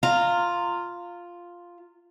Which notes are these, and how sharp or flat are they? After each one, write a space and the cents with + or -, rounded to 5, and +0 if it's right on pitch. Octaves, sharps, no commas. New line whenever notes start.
F4 +0 A#5 -25